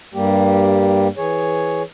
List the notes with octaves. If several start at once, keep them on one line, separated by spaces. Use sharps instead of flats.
G2 G3 A#3 G4
E3 G#4 C#5